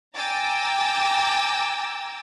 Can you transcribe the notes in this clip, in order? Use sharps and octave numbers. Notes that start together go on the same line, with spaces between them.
G5 G#5 A#5 D6 E6 A6